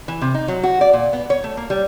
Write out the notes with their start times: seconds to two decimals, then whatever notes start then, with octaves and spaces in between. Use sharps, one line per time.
0.08 E3
0.21 C3
0.34 D#4
0.48 F#3
0.64 F#4
0.81 D5
0.93 A#2
1.13 B3
1.30 C#5
1.44 A3
1.57 A#3
1.70 G3